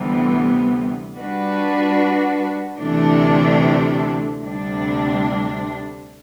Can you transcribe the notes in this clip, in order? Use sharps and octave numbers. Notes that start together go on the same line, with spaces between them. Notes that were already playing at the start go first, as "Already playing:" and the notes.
Already playing: D2 C3 E3 G3 B3
G3 D4 F#4 B4
D2 C3 E3 A3 D4
D2 C3 G3 D4